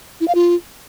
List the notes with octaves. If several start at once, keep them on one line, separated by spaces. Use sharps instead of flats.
E4
F5
F4